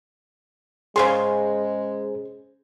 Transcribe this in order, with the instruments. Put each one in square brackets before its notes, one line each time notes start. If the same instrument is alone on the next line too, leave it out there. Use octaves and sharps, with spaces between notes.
[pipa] C#3 C#4 C6 [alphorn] G#3 [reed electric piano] G#4 C5